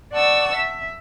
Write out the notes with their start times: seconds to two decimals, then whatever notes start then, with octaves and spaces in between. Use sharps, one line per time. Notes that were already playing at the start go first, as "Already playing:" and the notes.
0.14 D5 F#5 A5 C#6 E6
0.57 E5